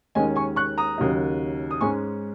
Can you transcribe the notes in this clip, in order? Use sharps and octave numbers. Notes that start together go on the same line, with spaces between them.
D#2 D#3 G#3 C#4 D#5 G#5
G#5 C#6
C#6 F#6
A#5 D#6
D#2 C#3 F#3 A#3 D#4
D#6
G#2 G#3 C#4 G#5 C#6